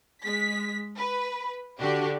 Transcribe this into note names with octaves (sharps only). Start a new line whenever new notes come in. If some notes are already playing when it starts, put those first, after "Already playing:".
G#3 B6
B4
D3 D4 F#4 G4